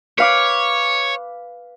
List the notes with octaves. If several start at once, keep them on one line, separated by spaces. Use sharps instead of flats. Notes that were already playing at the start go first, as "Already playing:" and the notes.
B4 C#5 F5 D6